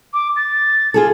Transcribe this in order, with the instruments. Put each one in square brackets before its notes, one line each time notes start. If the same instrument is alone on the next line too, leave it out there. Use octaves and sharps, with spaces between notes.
[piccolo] D6
A6
[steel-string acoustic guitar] F4 G#4 A4